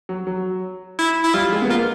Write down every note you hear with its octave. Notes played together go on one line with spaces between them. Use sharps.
F#3
F#3
E4
E4
G3 F4
G#3
B3
A#3 F4